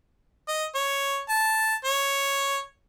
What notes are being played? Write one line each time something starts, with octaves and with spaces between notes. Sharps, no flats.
D#5
C#5
A5
C#5